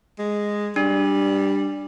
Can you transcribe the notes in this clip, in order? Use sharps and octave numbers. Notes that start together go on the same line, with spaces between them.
G#3
G3 D4